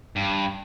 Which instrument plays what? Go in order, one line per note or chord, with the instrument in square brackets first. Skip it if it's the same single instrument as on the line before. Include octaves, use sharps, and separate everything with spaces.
[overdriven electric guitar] G2